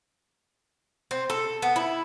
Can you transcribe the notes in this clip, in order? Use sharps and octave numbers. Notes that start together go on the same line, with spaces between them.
C4
A4
B3
E4